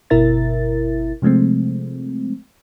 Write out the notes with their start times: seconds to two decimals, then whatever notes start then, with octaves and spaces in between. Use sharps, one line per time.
0.10 G1 B2 E4 A#4 E5 A6
1.22 C3 F3 G#3 A3 C4